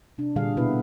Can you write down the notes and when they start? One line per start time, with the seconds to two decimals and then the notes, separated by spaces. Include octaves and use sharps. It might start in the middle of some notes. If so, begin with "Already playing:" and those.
0.18 C3 D4
0.36 A#2 D3 G3 G#4 F5
0.57 B2 B3 E4 B4